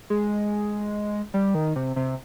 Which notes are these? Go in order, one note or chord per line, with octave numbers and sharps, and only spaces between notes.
G#3
G3
D#3
C3
C3